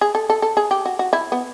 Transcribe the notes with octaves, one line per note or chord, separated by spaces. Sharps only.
G#4
A4
A4
A4
G#4
G4
F#4
F#4
E4
B3